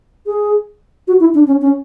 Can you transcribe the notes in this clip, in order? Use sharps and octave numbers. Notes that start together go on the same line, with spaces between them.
G#4
F#4
E4
D4
C#4
C#4